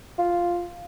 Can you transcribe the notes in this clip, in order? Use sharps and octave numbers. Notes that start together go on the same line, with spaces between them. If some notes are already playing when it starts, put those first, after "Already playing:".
F4